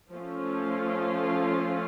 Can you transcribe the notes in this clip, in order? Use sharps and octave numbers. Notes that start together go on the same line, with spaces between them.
F3 A3 C#4 F4